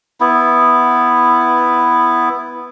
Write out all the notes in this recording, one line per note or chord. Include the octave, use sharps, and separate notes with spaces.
B3 E4